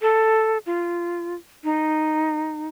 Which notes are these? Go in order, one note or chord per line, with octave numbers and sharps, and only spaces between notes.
A4
F4
D#4